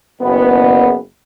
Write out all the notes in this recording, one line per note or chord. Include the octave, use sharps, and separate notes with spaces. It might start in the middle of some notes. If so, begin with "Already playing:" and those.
F#1 B3